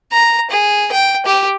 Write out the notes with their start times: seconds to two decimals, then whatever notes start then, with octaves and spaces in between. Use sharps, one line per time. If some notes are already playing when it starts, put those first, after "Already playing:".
0.12 A#5
0.51 G#4
0.92 G5
1.26 G4